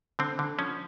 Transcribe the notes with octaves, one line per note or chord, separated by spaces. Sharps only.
D3 C4
D3
F3 C#4